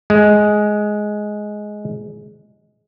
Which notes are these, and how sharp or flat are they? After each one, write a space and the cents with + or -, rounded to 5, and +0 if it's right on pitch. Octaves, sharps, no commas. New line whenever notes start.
G#3 +10